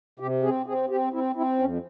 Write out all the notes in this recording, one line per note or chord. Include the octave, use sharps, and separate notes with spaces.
C3 G4
C4 G#4
C4 G#4
C4 G4
C4 E4
C4 E4
F2 C#4